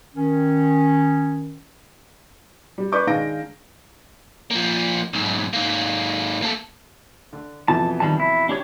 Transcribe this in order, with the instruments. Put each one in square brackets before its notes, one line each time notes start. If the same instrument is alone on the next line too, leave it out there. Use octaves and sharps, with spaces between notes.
[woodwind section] D#3 C#4
[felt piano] G3
B4 D5 C#6 D6 G6
D#3 G#3 D4 F5 A#6 D7
[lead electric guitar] F3 A#3
B1 G#2
G#2 A#3
A#3 A4
[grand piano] D3
[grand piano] F2 B2 E3 [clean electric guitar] A5
[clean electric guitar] D#3 G3 A5
E4
D4 G4 C#5